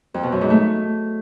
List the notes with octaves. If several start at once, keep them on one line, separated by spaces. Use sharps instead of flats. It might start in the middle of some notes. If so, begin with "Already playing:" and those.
F2
B2
F#2
G#2
A3